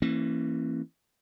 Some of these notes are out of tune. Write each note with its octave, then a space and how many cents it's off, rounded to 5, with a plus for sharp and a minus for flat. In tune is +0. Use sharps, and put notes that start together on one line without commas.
E3 +0 A#3 -30 C#4 -40